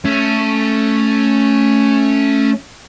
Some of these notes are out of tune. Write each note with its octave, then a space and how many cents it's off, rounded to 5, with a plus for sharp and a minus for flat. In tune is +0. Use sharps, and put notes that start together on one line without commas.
A3 +0 C#4 +0